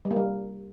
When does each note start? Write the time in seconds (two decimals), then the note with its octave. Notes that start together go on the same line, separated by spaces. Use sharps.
0.05 G3
0.11 A#3
0.16 G3